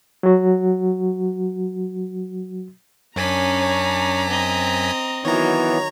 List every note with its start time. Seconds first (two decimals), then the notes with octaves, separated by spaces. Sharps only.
0.23 F#3 F#4
3.16 F#2 C#4 D4 G#5 A#5 B6
4.28 C4 D#5
5.25 D#3 E3 F#3 B3 C#5 A#5